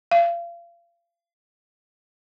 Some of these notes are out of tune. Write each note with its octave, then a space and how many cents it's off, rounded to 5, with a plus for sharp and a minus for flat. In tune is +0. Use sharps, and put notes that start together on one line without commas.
F5 -30